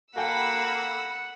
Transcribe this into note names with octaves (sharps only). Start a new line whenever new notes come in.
A#3 F#4 A4 F#5 G5 B5 E6